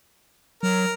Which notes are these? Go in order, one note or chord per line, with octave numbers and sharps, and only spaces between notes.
F#3 A#4